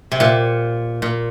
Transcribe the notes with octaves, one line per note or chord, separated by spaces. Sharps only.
C3
A#2
A#2